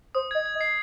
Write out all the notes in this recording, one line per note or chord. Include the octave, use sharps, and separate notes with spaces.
C5 D#6
D#5 G#6
G#6
D#5
C7